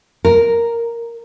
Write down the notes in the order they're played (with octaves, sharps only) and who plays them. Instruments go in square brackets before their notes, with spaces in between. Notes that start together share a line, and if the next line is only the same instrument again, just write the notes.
[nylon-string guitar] A#4